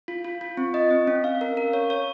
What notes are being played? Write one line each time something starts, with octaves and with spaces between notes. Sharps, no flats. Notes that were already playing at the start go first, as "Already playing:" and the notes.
F4
F4
F4
C4
D#5
C4
C#4
F5
A#4
A#4
C#5
C#5